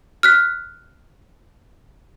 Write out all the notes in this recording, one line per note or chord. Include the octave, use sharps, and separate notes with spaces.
F6 F#6 B6